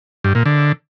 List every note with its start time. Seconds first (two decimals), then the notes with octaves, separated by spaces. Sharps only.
0.24 G2
0.35 A#2
0.46 D3